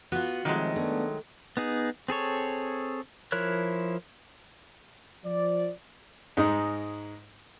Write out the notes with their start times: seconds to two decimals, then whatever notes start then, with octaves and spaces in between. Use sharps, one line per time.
0.12 B3 F4 F#4
0.45 C3 D#3 F3 F#3 G#3 A3
0.76 A3 B3 D4
1.57 B3 D#4 G#4
2.08 C4 G#4 A4 C#5
3.32 F3 E4 A#4 C#5 F#6
5.24 F3 D5
6.37 G#2 G#3 D#4